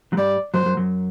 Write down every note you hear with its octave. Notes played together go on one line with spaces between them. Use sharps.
F#3
G2 G3 D5
F#2 F#3 C5
F#2 F#3
F#2 F#3